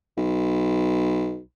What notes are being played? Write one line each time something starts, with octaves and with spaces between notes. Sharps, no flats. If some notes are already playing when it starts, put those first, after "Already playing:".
B1